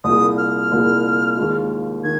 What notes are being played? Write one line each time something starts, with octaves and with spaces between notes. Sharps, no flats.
C2 A#2 A#3 F4 G#4 D#6
F6
C2 A#2 A#3 F4 G#4
D#2 D#3 G#3 F4
D#3 G#6